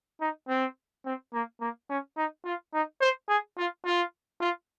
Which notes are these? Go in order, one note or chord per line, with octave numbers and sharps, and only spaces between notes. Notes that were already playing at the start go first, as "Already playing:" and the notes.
D#4
C4
C4
A#3
A#3
C#4
D#4
F4
D#4
C5
G#4
F4
F4
F4